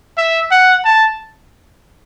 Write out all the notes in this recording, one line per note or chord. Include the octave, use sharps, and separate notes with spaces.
E5
F#5
A5